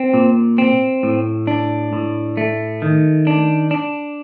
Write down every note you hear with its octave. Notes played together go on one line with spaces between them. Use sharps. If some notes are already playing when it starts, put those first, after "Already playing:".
Already playing: C4
A#2
C4
A2
D4
A2
A3
D#3
D4
D4